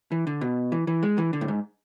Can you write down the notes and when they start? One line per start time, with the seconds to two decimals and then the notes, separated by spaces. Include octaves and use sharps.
0.12 E3
0.27 D3
0.41 B2
0.72 E3
0.87 E3
1.03 G#3
1.18 E3
1.33 D3
1.41 A2
1.48 G#2